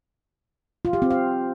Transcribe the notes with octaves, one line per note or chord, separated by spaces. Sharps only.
F4
G4
C4
F5